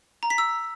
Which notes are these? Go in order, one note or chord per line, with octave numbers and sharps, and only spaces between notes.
A#5
B6
E6